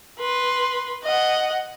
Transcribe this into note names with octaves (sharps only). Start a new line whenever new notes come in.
B4 C6
D#5 F#5